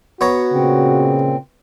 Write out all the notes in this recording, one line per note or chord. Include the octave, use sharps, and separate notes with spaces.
B3 F#4 C#5 A#5
A#2 C#3 C4